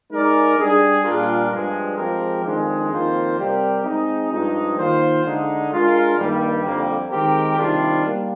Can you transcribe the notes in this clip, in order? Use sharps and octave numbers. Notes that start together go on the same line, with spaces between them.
G#3 D#4 A#4 D5
G3 D4 G#4
A#2 G3 D4 F4 A#4
G2 F3 G#3
F3 G#3 C4 G4 A#4
F2 D#3 G#3 D4 G#4
F2 D#3 A#3 F4 C5
C3 G3 C4 G4 A#4
G#3 C4 D#4
G2 F3 G#3 D#4
D#3 A#3 F4 C5
D3 G#3 D#4
G#3 D4 F4 A#4
G2 D#3 G3 A#3
F2 D3 G3 A#3
D#3 G#3 C4 G4 A#4
C3 D#3 G3 D4 F4
G3 A#3